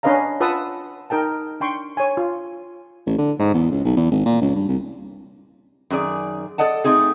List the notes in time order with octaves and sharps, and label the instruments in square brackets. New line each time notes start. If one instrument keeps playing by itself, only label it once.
[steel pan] C#4 D4 B4 D#5 F5 A#5
F4 B4 F#5 A5 D#6 E6
D#4 A#4 G5 A5
D4 G5 C6 C#6
C#5 G#5
F4
[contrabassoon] A1
D3
G#2
E2
C#2
B1
E2
G#1
A#2
C#2
G2
C2
[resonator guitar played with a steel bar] F#2 D#3 G#4 D5
A4 C5 D5 D#5 F#5 A5
A3 C4 D#4 G#4